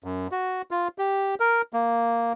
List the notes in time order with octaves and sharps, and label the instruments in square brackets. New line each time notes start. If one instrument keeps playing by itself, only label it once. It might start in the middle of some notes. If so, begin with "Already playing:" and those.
[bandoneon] F#2
F#4
F4
G4
A#4
A#3